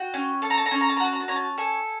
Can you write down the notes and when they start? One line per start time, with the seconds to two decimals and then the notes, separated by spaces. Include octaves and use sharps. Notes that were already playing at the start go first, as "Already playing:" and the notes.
Already playing: F#4 G5
0.14 C#4
0.42 A4 A5
0.50 A#5
0.57 A5
0.66 A#5
0.71 C#4 A5
0.81 A#5
0.89 A5
0.96 A#5
1.00 F#4 A5
1.13 A#5
1.20 A5
1.28 C#4 A#5
1.36 A5
1.58 A4 G#5